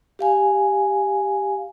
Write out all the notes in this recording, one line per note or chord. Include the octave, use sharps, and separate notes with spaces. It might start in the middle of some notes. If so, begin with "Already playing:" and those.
G4 F5 G#5